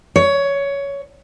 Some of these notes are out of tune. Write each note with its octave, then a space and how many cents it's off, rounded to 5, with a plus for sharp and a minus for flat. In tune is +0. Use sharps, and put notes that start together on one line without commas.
C#5 +15